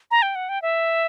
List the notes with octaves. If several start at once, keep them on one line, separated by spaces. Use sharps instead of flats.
A#5
G5
F#5
G5
E5